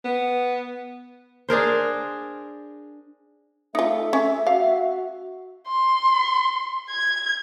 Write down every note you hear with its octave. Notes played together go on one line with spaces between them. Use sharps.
B3
D4 G#4 A#4 C5
A3 D#4 F4 E5
C#4
F#4 F5
C6
G#6